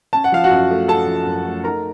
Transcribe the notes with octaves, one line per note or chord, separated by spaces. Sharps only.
C#4 A5
F#5
F3 F5
F#4 F#5
F#2
A3
C#4 A4 A5
F3
F#2
A3
D#4 A#4 A#5